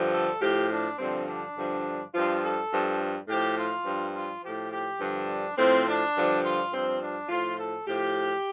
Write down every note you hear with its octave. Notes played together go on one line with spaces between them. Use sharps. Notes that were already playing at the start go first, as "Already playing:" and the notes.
Already playing: G2 D3 F3
A4
A2 F3 G4
D4
G2 D3 F3 C4
D4
G2 D3 F3
G2 F3 F4
A4
G2 F3
A2 F3 G4
F4
G2 F3
F4
A2 F3 G4
G4
G2 D3 F3 D4
A2 F3 C4
D4
G2 D3 F3
F4
G2 F3 C4
D4
A2 F3 F4
A4
A2 F3 G4